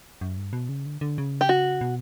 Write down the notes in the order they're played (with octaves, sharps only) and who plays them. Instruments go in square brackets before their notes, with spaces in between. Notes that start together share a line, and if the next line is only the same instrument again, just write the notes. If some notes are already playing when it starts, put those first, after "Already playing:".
[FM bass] F#2
G2
B2
C#3
D3
D3
C#3
[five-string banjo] G4
F#4
[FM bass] B2